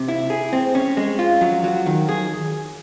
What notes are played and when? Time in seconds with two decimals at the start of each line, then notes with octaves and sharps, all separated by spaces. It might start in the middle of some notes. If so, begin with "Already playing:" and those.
Already playing: C3
0.08 E4
0.30 G#4
0.53 C4
0.75 C#4
0.97 G#3
1.19 F4
1.41 F#3
1.64 F#3
1.86 D#3
2.09 G#4